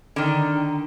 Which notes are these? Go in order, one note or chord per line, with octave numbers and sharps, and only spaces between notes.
D3 D#3